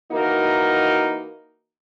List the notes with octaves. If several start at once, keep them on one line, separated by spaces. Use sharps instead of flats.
E3 A#3 D#4 F#4 A#4